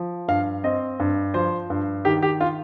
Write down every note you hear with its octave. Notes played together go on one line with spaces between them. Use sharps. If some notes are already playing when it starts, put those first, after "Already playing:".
Already playing: F3
G2 F5
C4 D#5
G2
F3 C5
G2
D#3 G4
G4
F4